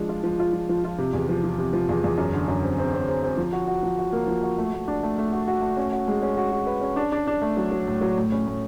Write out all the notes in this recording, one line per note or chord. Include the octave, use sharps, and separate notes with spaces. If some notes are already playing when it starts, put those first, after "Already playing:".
Already playing: F3 G#3 D4
F4
F3
F4
F3
F3
F4
C3
E2
F3
F3
C3
F3
E2
E2
F#2
D3
F#2
C4
C4
C4
C4
C4
F3
F#4
F#4
F3
F#4
A#3
F3
F#4
A3
A3
D4
A3
A3
F#4
F#4
A3
C#4
F#4
G#3
C#4
F#4
F#4
B4
C#4
D4
D4
D4
A3
F#3
F#3
A2
F#3
A2
C#4
A2